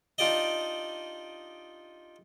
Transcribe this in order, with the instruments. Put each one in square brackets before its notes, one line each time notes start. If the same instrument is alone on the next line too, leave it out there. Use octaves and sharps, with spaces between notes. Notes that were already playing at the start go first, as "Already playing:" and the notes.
[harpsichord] D4 D#4 F4 G4 D5 D#5